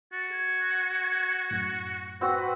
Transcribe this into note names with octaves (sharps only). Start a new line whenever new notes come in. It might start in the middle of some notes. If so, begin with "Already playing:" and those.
F#4 A6
G#6
F#2 A2
C4 F#4 B4 F#5